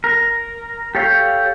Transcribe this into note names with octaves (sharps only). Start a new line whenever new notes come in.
A#4
G4 A4 C#5 F5 G5